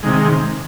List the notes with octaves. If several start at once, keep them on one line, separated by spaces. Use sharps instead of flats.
C3 D#3 G#3